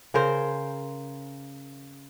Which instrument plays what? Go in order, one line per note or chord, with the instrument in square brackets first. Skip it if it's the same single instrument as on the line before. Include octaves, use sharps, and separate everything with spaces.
[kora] C#3 A#4 C5